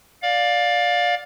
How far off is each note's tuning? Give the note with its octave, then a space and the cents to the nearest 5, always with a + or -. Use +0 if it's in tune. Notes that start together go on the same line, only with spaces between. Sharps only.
D5 +0 F5 +20